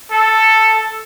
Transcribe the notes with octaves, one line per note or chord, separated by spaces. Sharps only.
A4